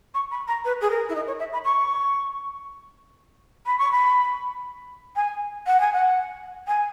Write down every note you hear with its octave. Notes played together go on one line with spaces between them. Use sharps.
C#6
B5
A#5
B4
G#4
A#4
E4
D#4
C#5
E5
B5
C#6
B5
C#6
B5
G#5
F#5
G#5
F#5
G#5